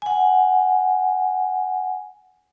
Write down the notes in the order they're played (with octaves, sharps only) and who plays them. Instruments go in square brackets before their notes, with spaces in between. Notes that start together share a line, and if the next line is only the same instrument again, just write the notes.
[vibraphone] F#5 G#5